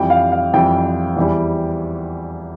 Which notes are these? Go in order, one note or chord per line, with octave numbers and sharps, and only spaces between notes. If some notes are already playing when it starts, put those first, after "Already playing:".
Already playing: F2 E3 G3 G5
F5
F5
F2 E3 G3 G5
E2 E3 G3